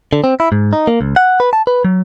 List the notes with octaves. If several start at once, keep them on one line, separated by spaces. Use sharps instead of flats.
D3
C4
E4
G#2
D#4
A#3
C#2
F#5
B4
A5
B4
F#3